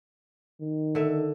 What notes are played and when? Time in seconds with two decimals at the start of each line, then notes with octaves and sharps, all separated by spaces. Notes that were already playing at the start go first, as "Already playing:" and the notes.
0.61 D#3
0.95 D3 E5